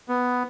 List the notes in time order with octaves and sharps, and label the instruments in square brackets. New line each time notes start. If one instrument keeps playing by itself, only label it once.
[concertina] B3